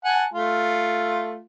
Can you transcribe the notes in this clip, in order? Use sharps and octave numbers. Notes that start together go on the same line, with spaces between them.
F#5 G#5 A5
A3 F4